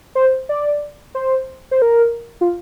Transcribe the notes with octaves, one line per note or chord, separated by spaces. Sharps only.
C5
D5
C5
C5
A#4
F4